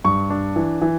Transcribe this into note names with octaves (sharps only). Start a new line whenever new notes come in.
G2 C#6
D4
E3
E3